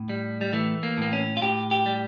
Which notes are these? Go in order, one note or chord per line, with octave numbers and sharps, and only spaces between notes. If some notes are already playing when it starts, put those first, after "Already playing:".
Already playing: A2
G3
G3
E3 A3
A#3
A2 A#3
C#4
F4
A2 G4
G4
G3